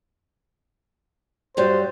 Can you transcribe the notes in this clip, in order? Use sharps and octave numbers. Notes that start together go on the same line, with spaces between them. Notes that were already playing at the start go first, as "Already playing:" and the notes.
G2 F#3 G3 C5